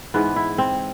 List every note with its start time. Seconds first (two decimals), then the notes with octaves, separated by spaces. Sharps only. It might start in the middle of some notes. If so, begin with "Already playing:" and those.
0.14 G#2 E3 B3
0.36 E4
0.58 C4